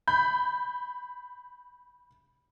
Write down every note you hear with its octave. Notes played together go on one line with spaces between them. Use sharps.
B5 G6